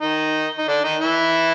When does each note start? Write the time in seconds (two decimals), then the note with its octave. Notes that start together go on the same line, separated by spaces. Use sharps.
0.01 D#3 D#4
0.58 D#4
0.68 D3 D4
0.84 D#3 D#4
1.01 E3 E4